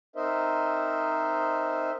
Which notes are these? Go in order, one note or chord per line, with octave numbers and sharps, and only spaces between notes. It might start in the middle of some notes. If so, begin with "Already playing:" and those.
C4 D#4 A#4 C5 D#5 E5